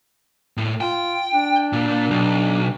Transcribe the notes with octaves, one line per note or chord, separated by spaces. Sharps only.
A2
F4 G5
D4
A#2
B1